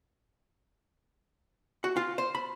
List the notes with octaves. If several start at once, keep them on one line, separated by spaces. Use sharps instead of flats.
F#4
F4
C5
B5